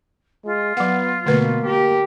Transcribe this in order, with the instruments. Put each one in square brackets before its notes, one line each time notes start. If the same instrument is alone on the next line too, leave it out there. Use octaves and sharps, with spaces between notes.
[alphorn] G#3 [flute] F4
[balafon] F#3 F#5 [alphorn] B3
[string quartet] B2 [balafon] D3 A3 B4 [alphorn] A#3
[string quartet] G4 A#4